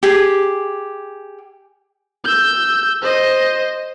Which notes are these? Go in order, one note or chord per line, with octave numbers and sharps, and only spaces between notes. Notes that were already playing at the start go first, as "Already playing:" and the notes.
G4 G#4
E6 G6
C5 D#5